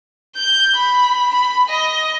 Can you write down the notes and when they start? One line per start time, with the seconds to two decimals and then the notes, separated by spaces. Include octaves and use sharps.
0.36 G6
0.76 B5
1.35 B5
1.69 D#5